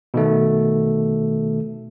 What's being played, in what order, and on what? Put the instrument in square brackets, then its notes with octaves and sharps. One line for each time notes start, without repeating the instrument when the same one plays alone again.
[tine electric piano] B2 D#3 A3